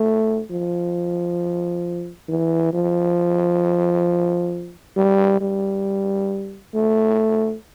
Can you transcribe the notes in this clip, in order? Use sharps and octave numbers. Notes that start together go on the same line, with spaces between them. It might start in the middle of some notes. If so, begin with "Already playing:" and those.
Already playing: A3
F3
E3
F3
G3
G3
A3